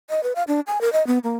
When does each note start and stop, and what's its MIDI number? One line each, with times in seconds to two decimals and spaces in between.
0.10 0.23 75
0.23 0.33 71
0.36 0.43 77
0.48 0.60 62
0.67 0.81 80
0.81 0.92 70
0.93 1.05 75
1.07 1.19 59
1.24 1.38 58